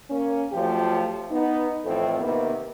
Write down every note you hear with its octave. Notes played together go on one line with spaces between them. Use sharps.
A#3 C#4
F2 F3 F#3 A3 G4
B3 D#4
F2 A2 E3 C4 A4
C3 D#3 A#3 B3